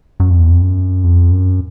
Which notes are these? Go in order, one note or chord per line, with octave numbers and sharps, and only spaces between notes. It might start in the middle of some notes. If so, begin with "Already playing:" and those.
F#2
F2
E2
F2
F#2
F2
F#2